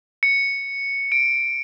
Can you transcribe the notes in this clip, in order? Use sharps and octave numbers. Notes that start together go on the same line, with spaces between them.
C#7
D7